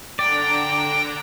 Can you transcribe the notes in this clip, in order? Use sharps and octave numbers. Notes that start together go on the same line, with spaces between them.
D3 D4 D5 G5 A#5